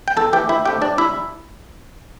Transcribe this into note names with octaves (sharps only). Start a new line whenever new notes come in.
G5
E2 A4 A5
E3 A3 G4 G5
D2 E4 E5
D3 A3 C4 G4 G5
G2 D4 D5
G3 E4 E5